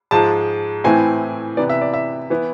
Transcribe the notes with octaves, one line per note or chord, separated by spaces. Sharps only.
G#2 F3 G#3 A5
A2 E3 A3 C4 G#5
C3 E3 B3 D5
E5
D5
E5
E3 B3 E4